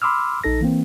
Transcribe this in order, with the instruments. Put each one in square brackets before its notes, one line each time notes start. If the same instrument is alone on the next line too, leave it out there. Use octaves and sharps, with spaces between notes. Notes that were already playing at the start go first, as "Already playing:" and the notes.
[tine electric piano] B5 C6 D6 E6 F6
A#1 D#4 A4 A#6
E3 A#3 C4